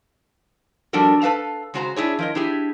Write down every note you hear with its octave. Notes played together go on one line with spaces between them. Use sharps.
F3 G3 D4 F#4 A4 A#4
A4 B4 E5 F5 A5
C#3 G#3 F#4 C5 A5 A#5
D4 E4 G#4 C#5
F3 A#4 D#5
D4 E4 G4 G#4